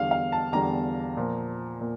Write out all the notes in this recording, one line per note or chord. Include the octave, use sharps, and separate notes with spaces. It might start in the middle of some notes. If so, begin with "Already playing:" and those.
Already playing: E2 D3 G3 F5
F5
A5
E2 D3 G3 A#5
A#2 F3
A#2